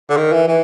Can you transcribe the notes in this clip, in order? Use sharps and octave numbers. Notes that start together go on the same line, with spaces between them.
D3
D#3
E3
E3